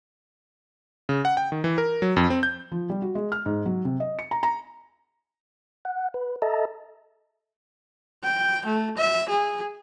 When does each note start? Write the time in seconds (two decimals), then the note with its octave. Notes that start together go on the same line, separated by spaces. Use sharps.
1.09 C#3
1.25 F#5
1.37 G5
1.52 D#3
1.64 E3
1.78 A#4
2.02 F#3
2.16 F2
2.30 C4
2.43 G6
2.72 F3
2.90 G3
3.02 F#4
3.15 G#3
3.32 F6
3.46 G#2
3.66 F#3
3.85 C3
4.00 D#5
4.19 C#7
4.31 A#5
4.43 A#5
5.85 F#5
6.14 B4
6.42 A4 D#5 E5 A5 A#5
8.23 G5
8.66 A3
8.97 E5
9.29 G#4